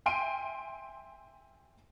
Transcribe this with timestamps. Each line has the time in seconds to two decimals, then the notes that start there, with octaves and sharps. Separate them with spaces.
0.06 E5 G5 G#5 C6 D7 D#7